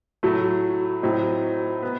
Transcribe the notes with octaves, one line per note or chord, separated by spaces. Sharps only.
A2 F#3 A3
A2 F#3 C4 D#4
B3